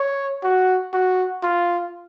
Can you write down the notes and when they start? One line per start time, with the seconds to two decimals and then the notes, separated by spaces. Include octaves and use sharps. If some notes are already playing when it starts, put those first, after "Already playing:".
Already playing: C#5
0.43 F#4
0.93 F#4
1.43 F4